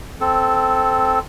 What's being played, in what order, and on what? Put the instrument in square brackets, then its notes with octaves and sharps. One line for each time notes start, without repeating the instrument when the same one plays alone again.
[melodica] C4 A4